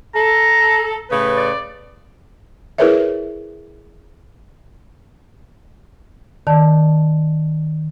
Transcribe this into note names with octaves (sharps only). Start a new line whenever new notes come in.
A4 A#5
A2 C#3 B4
D5
E4 G#4 A#4 B4 C#5 E5
D#3 D5 A5